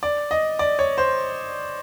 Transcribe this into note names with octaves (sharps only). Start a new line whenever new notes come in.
D5
D#5
D5
C#5
C5